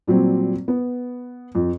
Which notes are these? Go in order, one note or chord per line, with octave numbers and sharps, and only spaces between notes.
A#2 F#3 G3 C4
B3
F2